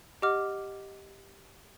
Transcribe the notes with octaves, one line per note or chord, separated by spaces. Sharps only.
G4 D#5 F#5 D6 F6